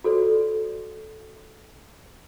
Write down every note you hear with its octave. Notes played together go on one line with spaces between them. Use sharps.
F#4 A4 C5 D5